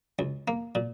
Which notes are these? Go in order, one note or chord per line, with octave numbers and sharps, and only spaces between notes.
C#2
A#3
A#2